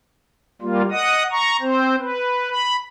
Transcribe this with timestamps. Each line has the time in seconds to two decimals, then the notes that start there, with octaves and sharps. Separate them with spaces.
0.62 G3 A#3 F4
0.91 D#5 F#5 D#6
1.31 A#5 C#6
1.61 C4 C5
2.00 B4
2.51 B5